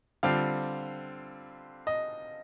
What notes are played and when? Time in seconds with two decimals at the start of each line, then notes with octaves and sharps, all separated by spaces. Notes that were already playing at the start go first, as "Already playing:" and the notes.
0.23 D3 G3 C4 F4 F5
1.87 D#5